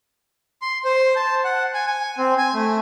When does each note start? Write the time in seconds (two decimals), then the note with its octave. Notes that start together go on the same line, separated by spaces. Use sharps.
0.62 C6
0.85 C5
1.16 A5
1.44 F#5
1.74 G#5
1.87 G#5
2.18 C4
2.38 G#5
2.54 A3